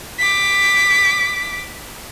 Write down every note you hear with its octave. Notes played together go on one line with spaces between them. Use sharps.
D6 B6